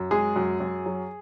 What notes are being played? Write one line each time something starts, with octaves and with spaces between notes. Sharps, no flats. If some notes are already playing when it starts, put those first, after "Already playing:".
Already playing: F#2
G#3 G#4
F#2
F#2
F#3